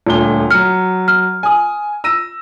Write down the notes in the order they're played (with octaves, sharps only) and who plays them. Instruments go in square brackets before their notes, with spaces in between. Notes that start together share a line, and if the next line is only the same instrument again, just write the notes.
[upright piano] D#1 D2 G7
[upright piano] F#3 C#7 [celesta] F6
[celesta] F6
[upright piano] G#5 D#6
E6 A#6 D#7